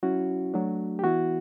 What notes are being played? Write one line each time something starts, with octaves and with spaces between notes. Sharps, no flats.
F#3 C#4 E4 F#4
F#3 A3 D4
G4
E3 B3 E4 F#4